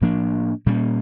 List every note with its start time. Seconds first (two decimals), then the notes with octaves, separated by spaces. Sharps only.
0.01 A2 F3 A#3 D4
0.66 A#2 G3 A#3 C#4